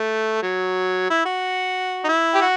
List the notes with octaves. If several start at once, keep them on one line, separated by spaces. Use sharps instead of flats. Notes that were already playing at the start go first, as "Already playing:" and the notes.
Already playing: A3
F#3
E4
F#4
D#4
E4
G4
F#4